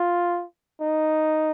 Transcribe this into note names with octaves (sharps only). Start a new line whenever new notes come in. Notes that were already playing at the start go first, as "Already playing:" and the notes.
Already playing: F4
D#4